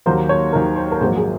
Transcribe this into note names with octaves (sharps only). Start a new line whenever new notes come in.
D#2 D#3 F#3 A#3 C5
C#5
D#2 D#3 F#3 A#3 A#4
C5
A#4
A#1 G#2 F#3 A#3 C5
G#4